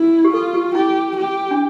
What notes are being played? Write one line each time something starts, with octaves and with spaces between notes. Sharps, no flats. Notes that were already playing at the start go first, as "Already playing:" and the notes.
Already playing: E4
G4
F4 A4
G4
E4 G4
G4
D4